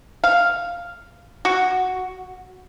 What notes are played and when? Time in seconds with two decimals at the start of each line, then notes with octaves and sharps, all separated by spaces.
0.24 F5
1.45 F#4